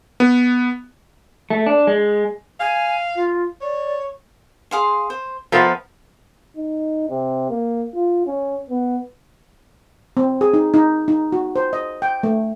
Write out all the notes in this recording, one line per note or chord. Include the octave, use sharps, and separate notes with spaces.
B3
A3
D4
G#3
F5 G#5
F4
C#5 D5
G#4 F5 C6
C5
F3 B3 F4 A#4 E5 B5
D#4
C3
A#3
F4
C#4
B3
C4
G#4
D#4
D#4
D#4
F#4
C5
D#5
G5
A3